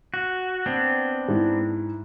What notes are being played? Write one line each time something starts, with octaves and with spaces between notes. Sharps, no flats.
F#4
B3 C4 D4
G#2 D#4 E4